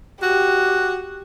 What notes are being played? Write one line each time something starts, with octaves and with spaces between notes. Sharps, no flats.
F#4 G4